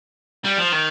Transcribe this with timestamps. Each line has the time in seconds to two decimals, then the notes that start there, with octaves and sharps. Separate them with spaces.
0.45 G3
0.58 F3
0.72 D#3